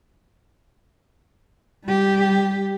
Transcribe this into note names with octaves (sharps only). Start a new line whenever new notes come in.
G3 G4